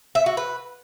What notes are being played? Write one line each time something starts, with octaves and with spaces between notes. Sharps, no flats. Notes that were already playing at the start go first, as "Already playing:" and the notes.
E5
F#4
B4